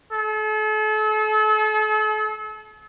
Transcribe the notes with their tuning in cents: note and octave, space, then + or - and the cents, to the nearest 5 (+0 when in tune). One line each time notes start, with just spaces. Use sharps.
A4 -40